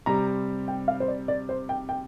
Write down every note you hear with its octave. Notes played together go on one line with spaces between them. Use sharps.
C3 G3 C4 G4 A#5
G5
F5
C5
D5
D5
C5
G5
G5